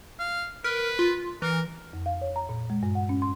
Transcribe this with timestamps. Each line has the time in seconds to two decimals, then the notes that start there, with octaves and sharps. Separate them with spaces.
0.19 F5
0.64 A#4 B4
0.99 F4
1.42 E3 A#4
1.93 F2
2.06 F5
2.22 C#5
2.36 A#5
2.49 A#2
2.70 G#3
2.83 G2
2.95 F#5
3.09 C#4
3.22 C6